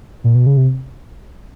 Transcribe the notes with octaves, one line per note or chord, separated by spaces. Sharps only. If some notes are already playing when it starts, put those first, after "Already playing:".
A#2
B2
C#3
C3